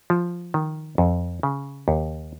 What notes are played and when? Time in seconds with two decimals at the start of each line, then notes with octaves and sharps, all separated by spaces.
0.10 F3
0.54 D#3
0.98 F2
1.43 C#3
1.88 D#2